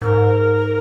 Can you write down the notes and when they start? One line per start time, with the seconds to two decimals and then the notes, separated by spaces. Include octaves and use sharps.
0.02 G#2 A#4